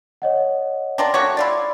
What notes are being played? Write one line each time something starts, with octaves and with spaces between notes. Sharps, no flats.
C#5 D#5 F#5
D4 F4 A#4 G5
A3 F#4 C#5 D6
E4 F4 D5